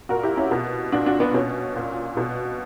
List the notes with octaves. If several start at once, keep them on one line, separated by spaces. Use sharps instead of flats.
A#2 F#4 A#4
E4 G4
C#4 E4
B2
A#2 D4 F#4
D4 F#4
B3 D4
B2 C#4
A#2
B2